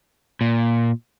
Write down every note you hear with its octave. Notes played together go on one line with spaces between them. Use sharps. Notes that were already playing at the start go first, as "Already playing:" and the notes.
A#2